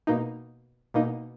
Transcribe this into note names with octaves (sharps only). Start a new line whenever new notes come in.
B2 A#3 D#4
B2 A#3 D#4